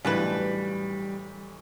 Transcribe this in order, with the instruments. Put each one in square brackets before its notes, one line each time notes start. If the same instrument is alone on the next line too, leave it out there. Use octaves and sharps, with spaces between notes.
[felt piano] B1 A2 E3 [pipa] C#3 D4 B4 [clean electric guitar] G3